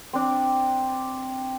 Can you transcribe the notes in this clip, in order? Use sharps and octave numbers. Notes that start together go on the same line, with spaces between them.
C4 D4